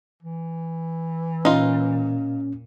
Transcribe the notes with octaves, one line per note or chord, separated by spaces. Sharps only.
E3
A#2 C#4 D#4 F4